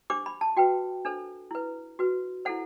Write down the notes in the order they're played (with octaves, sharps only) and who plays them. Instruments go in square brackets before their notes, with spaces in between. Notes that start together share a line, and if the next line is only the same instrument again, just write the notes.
[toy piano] D4 G4 C5 D6
B5
A5
F#4 B4 G5
D4 A4 C5
E4 B4
F#4 B4
E4 A4 C5 F#5